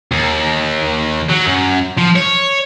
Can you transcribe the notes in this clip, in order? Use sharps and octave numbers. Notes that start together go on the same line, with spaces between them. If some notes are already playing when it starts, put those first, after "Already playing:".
D#2
F#3
F#2
F3
C#5